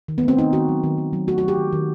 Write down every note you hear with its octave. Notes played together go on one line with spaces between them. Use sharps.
D#3
B3
A3 C4
D#3 D#4
D#3 F#4
F#3
D#3
D#3
F#3
A3 F#4
F#4
F#3 G4
D#3
D#3